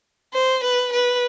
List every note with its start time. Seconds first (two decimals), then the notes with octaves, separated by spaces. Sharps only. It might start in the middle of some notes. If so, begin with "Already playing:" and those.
0.33 C5
0.64 B4
0.93 B4